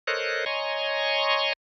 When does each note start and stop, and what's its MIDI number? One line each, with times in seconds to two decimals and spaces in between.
0.07 0.45 69
0.07 0.45 70
0.07 0.45 72
0.07 0.45 73
0.07 0.45 75
0.07 0.45 90
0.46 1.53 73
0.46 1.53 75
0.46 1.53 80
0.46 1.53 82
0.46 1.53 84
0.46 1.53 85